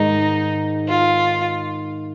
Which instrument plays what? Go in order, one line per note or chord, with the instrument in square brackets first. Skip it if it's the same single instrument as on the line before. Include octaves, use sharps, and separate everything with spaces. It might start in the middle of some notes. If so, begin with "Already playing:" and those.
Already playing: [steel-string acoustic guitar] G#2 D#3 G#3 [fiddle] D#4
[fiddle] F4